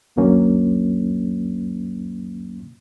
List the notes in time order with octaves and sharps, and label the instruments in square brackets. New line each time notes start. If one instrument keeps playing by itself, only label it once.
[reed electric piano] C#2 F#2 D3 F#3 A#3 C#4